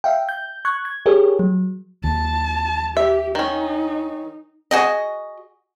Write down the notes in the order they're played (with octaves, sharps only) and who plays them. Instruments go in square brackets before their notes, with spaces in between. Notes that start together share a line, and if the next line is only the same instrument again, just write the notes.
[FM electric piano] E5 F5 G5
G6
C#6 F#6 G#6
G#6
G4 G#4 A#4 C#5
F#3
[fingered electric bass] D#2 [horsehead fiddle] A5
[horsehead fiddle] G4 [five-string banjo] E5
[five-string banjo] D#3 C#4 [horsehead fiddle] D#4
[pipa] F#4 G#4 D#5